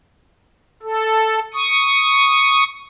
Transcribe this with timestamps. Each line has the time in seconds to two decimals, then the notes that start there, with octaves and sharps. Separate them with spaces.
0.83 A4
1.54 C#6 D#6